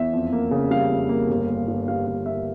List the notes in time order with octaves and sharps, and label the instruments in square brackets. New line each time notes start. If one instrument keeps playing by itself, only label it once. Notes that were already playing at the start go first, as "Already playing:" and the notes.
Already playing: [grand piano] E2 E5
F2
A#3
C#3
G3 F5
F2
A#3
G1
A#3
G2
G3 F5
G1 F5
A#3 E5